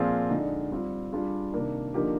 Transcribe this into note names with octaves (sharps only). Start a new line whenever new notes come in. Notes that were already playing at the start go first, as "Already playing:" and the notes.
Already playing: A#2 F3 C4 F4 G#4
D3 G#3 D#4
G3 C4 F4
G3 D4 F4 G#4
C3 D#3 A#3 D4
D3 F3 A#3 D#4 G4